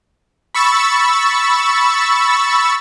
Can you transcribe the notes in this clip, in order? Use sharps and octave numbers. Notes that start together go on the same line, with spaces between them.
B5 C#6 E6 A6